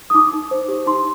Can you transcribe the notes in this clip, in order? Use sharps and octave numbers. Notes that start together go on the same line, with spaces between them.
D#6
D#4 D6
D#4
C5
G4
D#4 C6